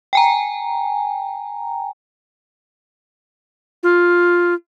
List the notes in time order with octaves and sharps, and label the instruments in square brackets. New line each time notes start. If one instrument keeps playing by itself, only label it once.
[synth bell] G5 G#5 A#5
[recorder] F4